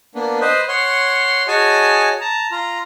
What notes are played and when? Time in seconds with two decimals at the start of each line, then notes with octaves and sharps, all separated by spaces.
0.15 A#3 B3 D4
0.41 B4 C5 D#5
0.68 C#5 F#5 C6
1.48 F#4 G#4 C#5 D#5 G#5 A5
2.20 A5 A#5
2.51 F4 A#5